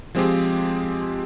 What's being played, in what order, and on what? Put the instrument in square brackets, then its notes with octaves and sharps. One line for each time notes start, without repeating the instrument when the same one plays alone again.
[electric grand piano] F3 G#3 C4 F4 G4 G#4